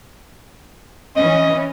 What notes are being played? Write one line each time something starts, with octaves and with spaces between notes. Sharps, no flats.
E3 C#4 D#5